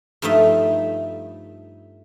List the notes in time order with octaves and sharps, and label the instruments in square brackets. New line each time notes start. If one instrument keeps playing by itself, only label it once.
[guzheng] G2 F3 A3 D#4 E5